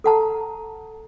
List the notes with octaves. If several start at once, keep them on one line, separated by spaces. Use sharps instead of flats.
A4 F#5 A5 A#5